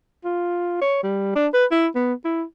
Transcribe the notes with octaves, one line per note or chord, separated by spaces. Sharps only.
F4
C#5
G3
D4
B4
E4
B3
E4